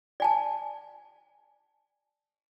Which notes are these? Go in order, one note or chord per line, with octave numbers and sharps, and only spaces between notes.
D5 G#5 A5